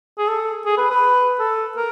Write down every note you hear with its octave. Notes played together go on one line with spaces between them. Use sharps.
G#4
A4
G#4
B4
B4
A4
A#4